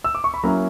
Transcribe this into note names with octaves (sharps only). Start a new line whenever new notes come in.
E6
D6
C#6
B5
F#3 A#3 C#4 E4 A#5